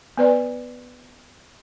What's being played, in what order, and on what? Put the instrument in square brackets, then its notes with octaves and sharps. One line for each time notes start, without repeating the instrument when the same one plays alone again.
[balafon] B3 B4 D5